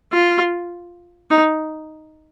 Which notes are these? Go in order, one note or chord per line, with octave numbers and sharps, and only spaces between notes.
F4
D#4